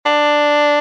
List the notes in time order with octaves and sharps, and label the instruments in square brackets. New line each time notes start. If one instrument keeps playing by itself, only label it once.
[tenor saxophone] D4